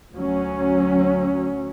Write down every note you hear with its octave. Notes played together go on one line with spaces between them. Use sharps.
D2 F#3 C#4